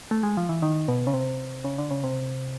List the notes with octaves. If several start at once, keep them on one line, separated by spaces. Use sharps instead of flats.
A3
G#3
F3
E3
D#3
B2
C#3
C3
C#3
D3
C#3
C3